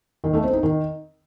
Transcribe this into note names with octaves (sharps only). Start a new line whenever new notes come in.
D#3
A3
C4
D#4
D#3